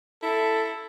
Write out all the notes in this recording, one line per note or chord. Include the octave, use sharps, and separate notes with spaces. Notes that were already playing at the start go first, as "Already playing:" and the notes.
E4 A4